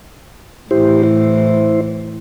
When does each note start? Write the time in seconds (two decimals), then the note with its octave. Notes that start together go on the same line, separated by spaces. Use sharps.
0.71 A2 E3 E4 G4 C5
1.03 E4 C5